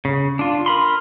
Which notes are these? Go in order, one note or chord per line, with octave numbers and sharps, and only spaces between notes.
C#3
D4 F4
A#4 B5 C6